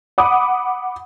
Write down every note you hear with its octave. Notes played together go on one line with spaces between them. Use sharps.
F#5 B5 D6 D#6